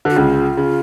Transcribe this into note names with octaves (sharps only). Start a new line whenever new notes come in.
D3 F#4
C#2 C#3 F4
C#3